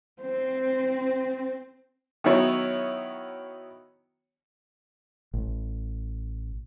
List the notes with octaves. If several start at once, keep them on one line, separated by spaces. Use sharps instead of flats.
C4 C5
D#3 F#3 B3 E4 C#5
A1